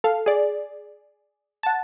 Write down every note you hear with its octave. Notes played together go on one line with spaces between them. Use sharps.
A4 F5
G#4 D5
F#5 A5